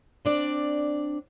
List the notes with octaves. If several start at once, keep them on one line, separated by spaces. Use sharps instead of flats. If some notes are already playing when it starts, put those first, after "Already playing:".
C4 D4 D5